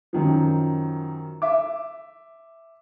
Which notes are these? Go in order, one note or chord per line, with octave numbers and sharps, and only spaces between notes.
F#2 D#3 F3
E5 D6